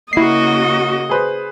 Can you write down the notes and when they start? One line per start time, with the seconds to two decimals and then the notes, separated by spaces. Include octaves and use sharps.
0.13 C#3 A#3 E4 F#4 D#5 C7
1.09 G#4 B4 C5